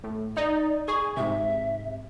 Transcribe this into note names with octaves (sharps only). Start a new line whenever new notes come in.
A2
D#4 D5
G#4 C#6
G#2 C3 E5